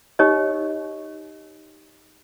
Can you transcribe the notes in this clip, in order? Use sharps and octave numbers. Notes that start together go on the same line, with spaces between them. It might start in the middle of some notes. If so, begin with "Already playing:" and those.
D#4 G4 C#5 D#5